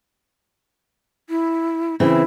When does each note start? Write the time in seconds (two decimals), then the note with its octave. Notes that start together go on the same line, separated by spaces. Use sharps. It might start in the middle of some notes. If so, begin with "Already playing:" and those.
1.30 E4
2.00 C#3 E3 C4 E4